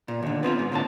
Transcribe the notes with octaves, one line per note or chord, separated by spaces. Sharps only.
A#2
D#2 D3
B3 C4 D#4 F4
G#2
A2 D3 A#3 A5